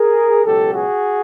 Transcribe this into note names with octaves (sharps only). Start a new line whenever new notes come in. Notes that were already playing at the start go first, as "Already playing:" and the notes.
Already playing: G#4 A#4
C#2 B2 F#3 G4 A4
F#4 G#4